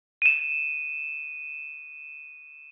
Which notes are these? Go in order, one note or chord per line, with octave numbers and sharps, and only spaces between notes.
D#7 E7